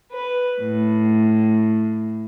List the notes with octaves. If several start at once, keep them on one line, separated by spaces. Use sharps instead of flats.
B4
A2